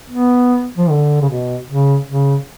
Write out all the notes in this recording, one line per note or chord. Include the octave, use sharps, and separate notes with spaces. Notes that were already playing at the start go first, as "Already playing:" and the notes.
B3
F3
D3
C#3
B2
C#3
C#3